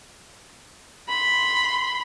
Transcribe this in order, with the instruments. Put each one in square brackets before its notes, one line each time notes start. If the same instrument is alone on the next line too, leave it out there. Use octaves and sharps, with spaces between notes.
[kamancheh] B5 C6